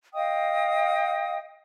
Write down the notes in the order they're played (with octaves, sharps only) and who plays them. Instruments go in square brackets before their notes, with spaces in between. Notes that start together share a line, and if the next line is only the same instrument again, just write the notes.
[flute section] D#5 F5 G5 D#6